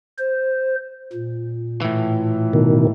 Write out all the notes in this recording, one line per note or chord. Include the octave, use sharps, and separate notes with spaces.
C5
A#2
A2 E3
B2 D#3